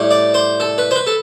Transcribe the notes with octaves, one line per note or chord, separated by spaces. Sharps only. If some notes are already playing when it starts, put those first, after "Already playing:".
Already playing: A2 G3
D5
C5
A4
B4
C5
B4
A4